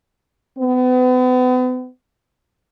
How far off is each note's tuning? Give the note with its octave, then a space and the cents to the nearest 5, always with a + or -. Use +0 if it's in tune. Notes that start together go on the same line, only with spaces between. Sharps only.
B3 +40